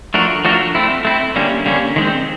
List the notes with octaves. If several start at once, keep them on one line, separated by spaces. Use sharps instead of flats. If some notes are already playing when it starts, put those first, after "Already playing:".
F3 A3 D4 F#4 A#4
F3 A3 D4 F#4 A#4
A3 C4 E4
A3 C4 E4
D3 G3 A#3 C#4
D3 G3 A#3 C#4
D#3 G#3 C4